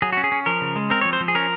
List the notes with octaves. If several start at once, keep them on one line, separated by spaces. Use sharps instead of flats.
F#3 G#4
C#4 F#4
G#4
C#4
F3 A#4
C#3
G#3
C4 A#4
C#5
F3
C5
F3
G#4
C#4 A#4